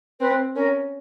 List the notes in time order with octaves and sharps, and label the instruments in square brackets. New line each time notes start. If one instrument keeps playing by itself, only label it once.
[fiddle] C4 [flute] B4
[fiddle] C#4 [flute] A#4